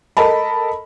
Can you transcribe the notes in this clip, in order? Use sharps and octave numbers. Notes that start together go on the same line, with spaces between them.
A4 A#4 D#5 A5 B5